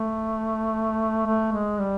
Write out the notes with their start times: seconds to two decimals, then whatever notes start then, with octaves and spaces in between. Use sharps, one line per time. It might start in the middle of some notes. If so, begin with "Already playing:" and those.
Already playing: A3
1.27 A3
1.53 G#3
1.79 G3